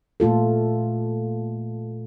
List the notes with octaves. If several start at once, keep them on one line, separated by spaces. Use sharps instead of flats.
A#2 A3 F4 A4